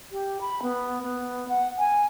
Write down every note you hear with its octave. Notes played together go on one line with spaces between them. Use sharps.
G4
B5
B3
B3
F#5
G#5